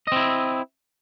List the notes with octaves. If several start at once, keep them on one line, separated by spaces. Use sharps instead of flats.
C4 E4 D#5